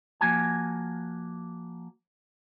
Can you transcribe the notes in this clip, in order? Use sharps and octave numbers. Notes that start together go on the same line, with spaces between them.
F3 A#3 F#4 G#5